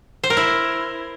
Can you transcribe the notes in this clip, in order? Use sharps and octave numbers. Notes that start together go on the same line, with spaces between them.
C5
A#4
E4